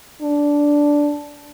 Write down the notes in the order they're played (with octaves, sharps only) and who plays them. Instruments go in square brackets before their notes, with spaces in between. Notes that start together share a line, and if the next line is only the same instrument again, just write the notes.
[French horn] D4